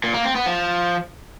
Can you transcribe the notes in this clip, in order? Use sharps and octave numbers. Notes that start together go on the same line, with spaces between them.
A#2
A#3
C4
B3
F3